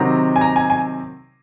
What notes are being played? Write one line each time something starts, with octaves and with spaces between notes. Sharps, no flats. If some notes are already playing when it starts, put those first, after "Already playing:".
Already playing: C3 D#3 F#3 C4 D#4 A#5
G#5
A#5
G#5
G#5